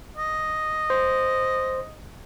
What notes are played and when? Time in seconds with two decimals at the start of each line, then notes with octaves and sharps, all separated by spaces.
0.17 D#5
0.90 C5